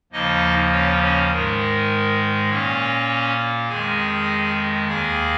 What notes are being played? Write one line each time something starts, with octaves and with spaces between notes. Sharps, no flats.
D#2 C#3 F3 A#3 D#4 D#5
C#4 C#5
C#4 C#5
G#2 D#3 G#3 A#4
A#2 A#3 C#4 C#5
F2 D#3 G#3 G#4 G#5
D#2 D#3 A#3 G#4 G#5